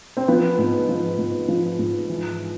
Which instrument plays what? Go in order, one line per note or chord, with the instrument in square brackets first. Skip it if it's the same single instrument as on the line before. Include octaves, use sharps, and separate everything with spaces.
[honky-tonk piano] C4
F3 B3
G#2
F3
G#2
F3
G#2
E3